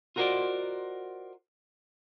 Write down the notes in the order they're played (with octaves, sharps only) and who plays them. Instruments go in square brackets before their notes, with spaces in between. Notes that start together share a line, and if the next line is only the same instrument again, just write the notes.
[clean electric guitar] F4 F#4 A#4 C5 D5 D#5